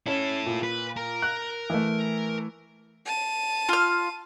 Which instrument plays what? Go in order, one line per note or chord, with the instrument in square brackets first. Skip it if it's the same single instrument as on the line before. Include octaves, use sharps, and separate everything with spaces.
[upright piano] C#4 [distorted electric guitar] E4 A4
[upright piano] A#2
[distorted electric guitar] B4
A#4 A#5
[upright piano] F#6
E3 A3
[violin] A5 D#7
[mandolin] F4 F6